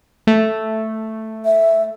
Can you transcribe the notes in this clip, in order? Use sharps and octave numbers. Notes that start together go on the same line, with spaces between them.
A3
E5